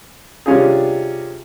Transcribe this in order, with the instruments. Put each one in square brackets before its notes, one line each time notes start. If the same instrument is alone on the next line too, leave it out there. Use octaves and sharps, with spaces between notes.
[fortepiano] C3 G3 C#4 D4 F4 G#4